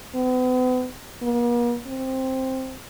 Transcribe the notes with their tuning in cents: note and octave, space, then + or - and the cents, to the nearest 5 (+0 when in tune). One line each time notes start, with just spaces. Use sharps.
B3 +40
A#3 +45
C4 +5